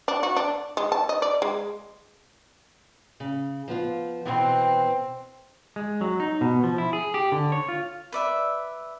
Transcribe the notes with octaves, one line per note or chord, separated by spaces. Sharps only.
D4
F#4
D4
G#3
A5
D#5
D5
G#3
C#3
F3 B3 F4
B2 E3 C4
G#3
F#3
D#4
B2
F3
E4
G#4
G4
D3
C#5
F4
B4 D5 E5